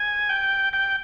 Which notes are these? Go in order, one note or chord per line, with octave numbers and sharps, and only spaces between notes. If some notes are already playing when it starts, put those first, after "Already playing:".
Already playing: G#5
G5
G5